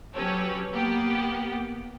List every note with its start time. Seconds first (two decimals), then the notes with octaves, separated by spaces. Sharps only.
0.15 F#3 C#4 G4 A4 B4 C#5
0.72 A#3 B3 G4 F#5